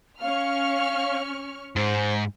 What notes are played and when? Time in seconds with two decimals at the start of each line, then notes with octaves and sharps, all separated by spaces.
0.22 C#4 F5 C#6 F6
1.76 G#2 C5